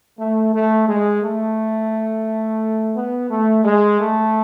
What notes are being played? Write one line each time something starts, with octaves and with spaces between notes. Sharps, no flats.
A3
A3
G#3
A3
B3
A3
G#3
A3